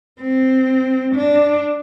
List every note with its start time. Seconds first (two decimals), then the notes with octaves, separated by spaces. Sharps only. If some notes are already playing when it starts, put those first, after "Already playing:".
0.20 C4
1.15 D4